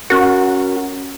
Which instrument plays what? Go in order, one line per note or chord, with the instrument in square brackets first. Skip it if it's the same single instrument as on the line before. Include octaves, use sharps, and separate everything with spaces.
[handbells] C#4 A#4 [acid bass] F#4